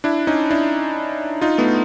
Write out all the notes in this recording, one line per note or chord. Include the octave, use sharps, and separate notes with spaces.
D4 E4
C#4 D#4
D4 E4
D#4 F4
A3 B3